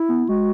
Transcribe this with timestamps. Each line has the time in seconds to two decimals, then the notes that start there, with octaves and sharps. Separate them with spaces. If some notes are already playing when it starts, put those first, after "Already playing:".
Already playing: E4
0.09 B3
0.29 G#3 F#4